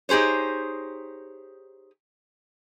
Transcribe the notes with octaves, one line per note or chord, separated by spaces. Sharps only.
D#4 G4 G#4 C5 C#5